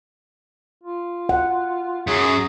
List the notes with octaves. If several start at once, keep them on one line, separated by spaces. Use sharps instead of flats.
F4
F#5
F#2 F#3 G#4